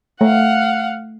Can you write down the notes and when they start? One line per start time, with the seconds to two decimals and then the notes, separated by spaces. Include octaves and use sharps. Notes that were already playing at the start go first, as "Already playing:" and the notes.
0.21 A3 F5 F#5